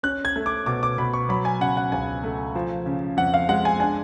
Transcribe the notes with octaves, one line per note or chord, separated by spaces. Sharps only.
C#4 F#6
G#6
A3
D6
B2 D6
D6
B2 B5
C#6
F#3 B5
G#5
C#3 F#5
F#5
C#2 G#5
A3
F3
C#3
F2 F#5
F5
G#3 F#5
G#5
D4 G#5